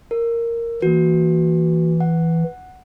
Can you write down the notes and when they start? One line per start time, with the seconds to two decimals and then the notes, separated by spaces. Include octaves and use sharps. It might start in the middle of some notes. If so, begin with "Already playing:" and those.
0.11 A#4
0.82 E3 A#3 F#4
2.00 F#5